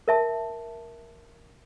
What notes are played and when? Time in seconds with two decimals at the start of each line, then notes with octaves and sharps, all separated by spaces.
0.08 A#4 E5 A5